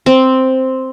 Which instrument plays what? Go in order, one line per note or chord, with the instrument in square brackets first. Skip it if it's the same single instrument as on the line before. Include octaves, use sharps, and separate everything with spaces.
[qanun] C4